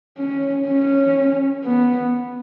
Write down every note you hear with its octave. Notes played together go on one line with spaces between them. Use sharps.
C#4
C#4
B3